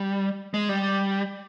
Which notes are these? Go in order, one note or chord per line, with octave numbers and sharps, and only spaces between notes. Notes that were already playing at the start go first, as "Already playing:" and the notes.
Already playing: G3
G#3
G3